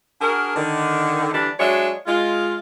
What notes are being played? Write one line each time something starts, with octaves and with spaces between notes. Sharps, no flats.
D4 F#4 G#4 A#4
D3 D#3
D3 E3 G3 D4
F#3 G#3 D4 C#5 E5
G#3 F4